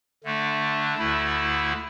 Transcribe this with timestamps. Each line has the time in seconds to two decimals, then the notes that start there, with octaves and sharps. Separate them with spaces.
0.24 D3 A3 D4
0.98 D2 D3 A3 E4